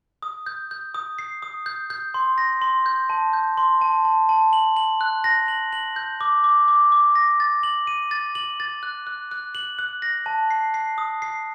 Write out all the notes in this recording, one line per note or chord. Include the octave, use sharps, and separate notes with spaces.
D#6
G6
G6
D#6
C7
D#6
G6
G6
C6
A#6
C6
G6
A5
G6
C6
A5
A5
A5
F#7
F#7
F#6
A#6
F#7
F#7
G6
D6
D6
D6
D6
A#6
A6
F#7
D#7
A6
F#7
A6
F#6
F#6
F#6
F#7
F#6
A#6
A5
C7
C7
D#6
C7